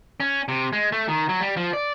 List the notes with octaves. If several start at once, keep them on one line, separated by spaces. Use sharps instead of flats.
C#4
C3
G#3
A3
D#3
F#3
G3
F3
D5